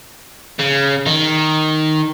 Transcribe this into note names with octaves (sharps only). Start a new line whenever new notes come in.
C#3
D#3